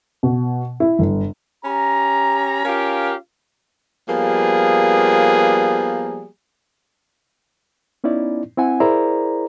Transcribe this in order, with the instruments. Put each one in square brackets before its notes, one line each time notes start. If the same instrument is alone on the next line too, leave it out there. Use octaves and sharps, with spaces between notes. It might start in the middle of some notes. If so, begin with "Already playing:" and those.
[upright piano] B2
E4
G1
[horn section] C#4 G4 A#5
C#4 F4 G4 A#4 F5
F3 G3 A#3 B3 G#4
[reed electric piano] B3 C#4 D#4 E4 D5
C4 E4 F#5 G#5
E4 G#4 A#4 C5 D5 A#5